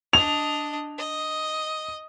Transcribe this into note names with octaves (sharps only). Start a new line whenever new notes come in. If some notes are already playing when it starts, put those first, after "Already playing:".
D4 D#5 F7
D#5